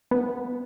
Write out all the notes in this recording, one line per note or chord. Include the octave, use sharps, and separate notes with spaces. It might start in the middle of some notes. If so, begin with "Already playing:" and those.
B3